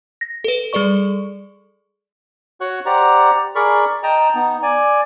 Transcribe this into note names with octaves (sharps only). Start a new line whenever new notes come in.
A#6
A4 B4
G3 G#4 A4 D5 C#6
F#4 C#5 F#5 C#6 F#6
G4 C5 D5 F#5 A#5
G#4 A#4 D5 B5 C#6
D#5 G5 A5 A#5
B3 D#4
D5 G#5